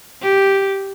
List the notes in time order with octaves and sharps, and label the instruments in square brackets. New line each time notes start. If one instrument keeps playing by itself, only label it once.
[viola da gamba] G4